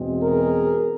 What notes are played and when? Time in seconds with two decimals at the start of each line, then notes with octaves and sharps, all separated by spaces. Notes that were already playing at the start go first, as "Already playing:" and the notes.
Already playing: E2 B2 G#3 C4
0.21 G#4 A#4